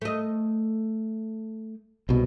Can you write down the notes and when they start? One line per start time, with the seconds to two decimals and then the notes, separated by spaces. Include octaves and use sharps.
0.01 A3 D#5
2.09 C2 B2